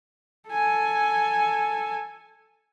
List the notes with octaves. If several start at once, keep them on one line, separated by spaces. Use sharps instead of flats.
A4 G#5